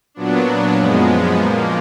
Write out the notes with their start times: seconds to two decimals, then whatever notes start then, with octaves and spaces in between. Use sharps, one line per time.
0.14 A#2 F#3 B3 D4
0.76 F#2 F3 G#3 B3
1.38 A#2 F3 A#3